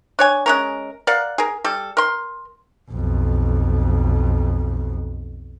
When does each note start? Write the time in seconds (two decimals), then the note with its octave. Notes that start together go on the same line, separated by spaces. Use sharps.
0.19 D4 C#5 G#5
0.46 G#3 C#4 A#4
1.07 A#4 D5 F5 F#5
1.38 G#4 A#4
1.64 G3 A4
1.97 A#4 C6
2.90 B1 F2